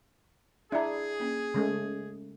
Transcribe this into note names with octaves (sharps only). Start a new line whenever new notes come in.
D4 E4 G#4 E5 A#5
A#3 C#4
C#3 G#3 A3